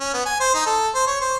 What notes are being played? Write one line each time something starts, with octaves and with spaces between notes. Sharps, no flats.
C#4
B3
G#5
C5
D#4
A4
C5
C#5
C5